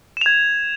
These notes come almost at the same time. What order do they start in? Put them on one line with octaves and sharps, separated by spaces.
E7 F7 G#6